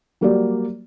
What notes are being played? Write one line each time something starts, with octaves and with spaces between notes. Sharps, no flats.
F#3 G3 A#3 F#4 G4 D5